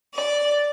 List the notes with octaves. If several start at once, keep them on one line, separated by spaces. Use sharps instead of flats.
D5